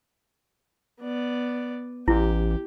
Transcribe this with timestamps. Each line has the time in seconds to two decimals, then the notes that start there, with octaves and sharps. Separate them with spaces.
1.01 B3 D5
2.08 A1 E4 G4